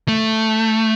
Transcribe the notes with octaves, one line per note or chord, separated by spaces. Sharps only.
A3